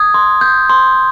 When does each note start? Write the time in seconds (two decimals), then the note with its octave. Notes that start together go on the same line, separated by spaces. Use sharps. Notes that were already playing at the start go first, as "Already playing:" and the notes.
Already playing: D#6 G#6
0.14 C6
0.41 G6
0.70 C6